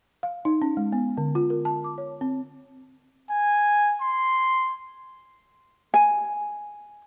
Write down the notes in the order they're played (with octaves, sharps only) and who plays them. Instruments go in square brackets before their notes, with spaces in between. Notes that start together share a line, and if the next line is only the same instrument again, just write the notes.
[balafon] F5
D#4
C#4
G#3
B3
D3
F4
A#4
A5
D6
C#5
C4
[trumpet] G#5
C6
[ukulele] G#5